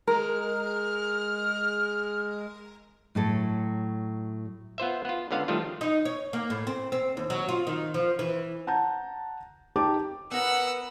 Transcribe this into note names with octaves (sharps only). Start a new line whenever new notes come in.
G#3 A#4 F6
A2 F#3 A4
B3 F4 C5 E5
B3 F4
C#2 D3 B3 F5
D#3 F3 G3 A3 F4
D#4
C#5
A#3
A2
C4
C4
D#2
F#3
F4
D#3
F3
E3
F#5 A5 A#5 G6
D#4 G4 A5 D6
B3 A#4 B4 F#5 E6